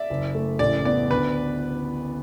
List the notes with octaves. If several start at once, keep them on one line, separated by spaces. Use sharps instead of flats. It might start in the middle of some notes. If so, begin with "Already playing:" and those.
Already playing: D5 E5
F#1
A3
A1 D5
B3 D5
D2 B4